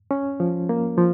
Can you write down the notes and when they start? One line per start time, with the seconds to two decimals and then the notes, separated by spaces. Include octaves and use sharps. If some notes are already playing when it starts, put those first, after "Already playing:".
0.11 C#4
0.40 F3
0.69 A#3
0.98 F3